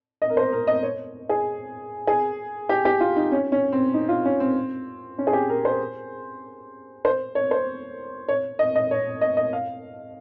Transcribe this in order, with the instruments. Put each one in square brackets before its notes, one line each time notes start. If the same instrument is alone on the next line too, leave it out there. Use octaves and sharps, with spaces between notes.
[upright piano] D#5
A#4
C5
A#4
D#5
C#5
G#4
G#4
G4
G4
F4
D#4
C#4
C#4
C4
D#4
F4
C#4
C4
C#4
G#4
G4
A#4
C5
C5
C#5
C5
C#5
D#5
D#5
C#5
D#5
D#5
F5